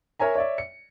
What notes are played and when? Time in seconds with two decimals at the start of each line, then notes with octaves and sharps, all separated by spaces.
0.20 A#4 C#5 E5 G#5 A#5
0.35 C#5 D5 E5
0.58 C#7